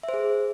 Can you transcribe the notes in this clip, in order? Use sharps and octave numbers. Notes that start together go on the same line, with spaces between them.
E5
C5
G#4